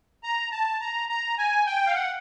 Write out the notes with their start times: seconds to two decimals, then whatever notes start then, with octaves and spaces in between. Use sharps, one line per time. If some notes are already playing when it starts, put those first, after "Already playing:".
0.24 A#5
0.52 A5
0.81 A#5
1.09 A#5
1.38 G#5
1.66 G5
1.87 F5
1.94 F#5